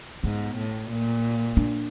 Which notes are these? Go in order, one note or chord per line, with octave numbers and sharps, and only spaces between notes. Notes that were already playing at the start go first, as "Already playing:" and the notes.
G#2 B3
A2
A#2
D4